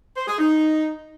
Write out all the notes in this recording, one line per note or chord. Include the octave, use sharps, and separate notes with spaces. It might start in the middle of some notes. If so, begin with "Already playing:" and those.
C5
G#4
D#4